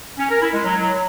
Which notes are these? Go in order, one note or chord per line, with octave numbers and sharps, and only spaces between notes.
C#4
A#4
E4
G#3
F#3